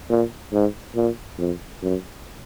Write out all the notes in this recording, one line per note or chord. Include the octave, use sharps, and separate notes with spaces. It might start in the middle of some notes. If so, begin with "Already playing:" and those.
A#2
G#2
A#2
F2
F#2